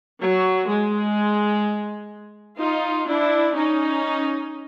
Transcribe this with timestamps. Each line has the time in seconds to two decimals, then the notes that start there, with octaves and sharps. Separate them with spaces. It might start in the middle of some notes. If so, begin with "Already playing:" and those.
0.21 F#3
0.68 G#3
2.60 D#4 F4
3.08 D4 E4
3.55 C#4 D#4